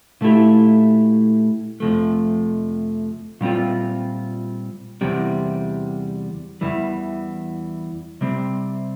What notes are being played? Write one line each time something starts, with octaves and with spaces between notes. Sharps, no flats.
A#2 A3 E4 G4
F2 C3 F3 A3
A#2 G3 C4 F4
E2 C3 G3
E2 C3 E3 G3
C3 G3 C4